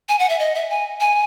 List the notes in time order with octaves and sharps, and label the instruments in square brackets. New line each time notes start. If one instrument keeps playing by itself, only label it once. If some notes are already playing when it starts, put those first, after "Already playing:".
[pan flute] G#5
F#5
E5
D#5
E5
G#5
G#5